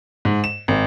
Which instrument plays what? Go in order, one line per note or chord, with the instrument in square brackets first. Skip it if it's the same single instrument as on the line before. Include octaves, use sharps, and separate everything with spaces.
[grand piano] G#2
E7
G#1